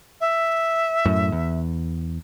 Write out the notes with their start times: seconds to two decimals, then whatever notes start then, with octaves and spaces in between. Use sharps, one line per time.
0.20 E5
1.05 F#2 A2
1.32 E2